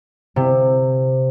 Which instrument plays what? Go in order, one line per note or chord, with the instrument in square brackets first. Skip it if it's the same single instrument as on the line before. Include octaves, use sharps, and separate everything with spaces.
[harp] C3